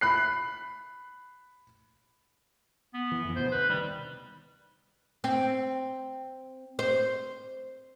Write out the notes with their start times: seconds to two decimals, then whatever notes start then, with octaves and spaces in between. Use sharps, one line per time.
0.01 B5 F#6 C7
2.94 B3
3.12 E3
3.25 F2 E3
3.36 D2 B2 B3 C5
3.52 B4
3.69 C3 D#3 G3
5.24 C4
6.79 C5